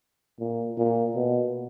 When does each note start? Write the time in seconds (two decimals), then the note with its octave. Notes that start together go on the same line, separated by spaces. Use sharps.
0.40 A#2
0.77 A#2
1.15 B2